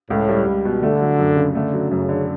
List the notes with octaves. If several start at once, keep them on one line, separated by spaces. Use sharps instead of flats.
C#2 A2
G3
C#2
B2
D3 A3
F#3
F#2
C#3
D3 A3
F#3
F#2 C#3
D3